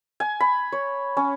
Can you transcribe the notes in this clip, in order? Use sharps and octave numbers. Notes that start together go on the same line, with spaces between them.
G#5
B5
C#5
C#4